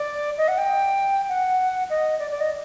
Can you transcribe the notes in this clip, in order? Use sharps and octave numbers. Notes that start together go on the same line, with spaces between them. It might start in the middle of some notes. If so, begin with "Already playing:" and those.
Already playing: D5
D#5
F#5
G5
F#5
D#5
D5
D5
D#5